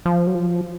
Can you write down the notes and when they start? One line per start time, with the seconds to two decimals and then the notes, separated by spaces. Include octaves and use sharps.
0.05 F3
0.27 F#3
0.35 F3